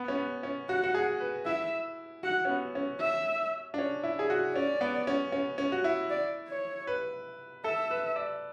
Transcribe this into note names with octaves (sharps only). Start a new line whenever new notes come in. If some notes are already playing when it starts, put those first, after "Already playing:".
Already playing: B3
C#4
B3
C#4
F#4 F#5
F#4
G#4
B4
E4 E5
F#4 F#5
C#4
B3
C#4
E5
D4
C#4
E4
G#4
F#4
C#4 D5
B3
C#4
C#4
C#4
F#4
E4
D5
C#5
B4
A4 E5
B4
D5